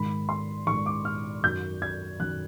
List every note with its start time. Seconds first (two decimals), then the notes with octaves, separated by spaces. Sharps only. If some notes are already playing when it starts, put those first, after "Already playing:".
Already playing: G#2 D#3 B5
0.29 C6
0.67 G#2 D#3 C#6
0.86 D6
1.05 F6
1.43 F#2 D#3 G6
1.82 G#6
2.20 F#2 D#3 F#6